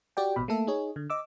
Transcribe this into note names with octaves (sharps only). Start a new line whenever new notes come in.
F#4 G4 D5 G5
A1 B2 B5
A3 A#3 A4 E5
D#4 G#4 C#5
D3
D#5 D6 E6